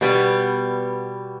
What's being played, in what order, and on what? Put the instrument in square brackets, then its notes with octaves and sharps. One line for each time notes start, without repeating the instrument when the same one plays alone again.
[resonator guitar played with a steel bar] B2 G3 B3